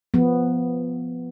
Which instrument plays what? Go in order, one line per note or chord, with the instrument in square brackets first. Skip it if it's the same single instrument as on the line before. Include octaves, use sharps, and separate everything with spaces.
[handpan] F3 B3